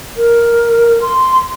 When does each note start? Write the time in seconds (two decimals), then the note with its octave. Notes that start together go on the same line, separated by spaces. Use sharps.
0.17 A#4
1.02 C6